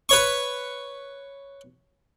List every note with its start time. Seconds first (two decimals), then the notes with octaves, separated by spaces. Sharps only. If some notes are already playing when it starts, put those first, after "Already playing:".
0.09 B4 C#5 C#6